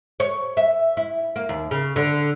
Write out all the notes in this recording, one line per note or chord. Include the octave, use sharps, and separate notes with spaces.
C#5
E5
E4
A#3
D#2
C#3
D3